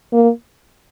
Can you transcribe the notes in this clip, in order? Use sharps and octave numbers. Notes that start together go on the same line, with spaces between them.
A#3